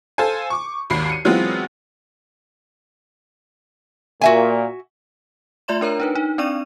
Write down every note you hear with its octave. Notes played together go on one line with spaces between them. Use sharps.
A4 C5 F5 G#5
C#6 D6
G#1 D#2 B5 C7
C#7 D#7
E3 F#3 G#3 B3 C4 F4
A#2 F#4 E5 G#5
A3 F4 D5 E5 C6 E7
D4 A#4 C#5 A#5
D4 D#4 B4
D#4
C4 D4 D5 C#6 D#7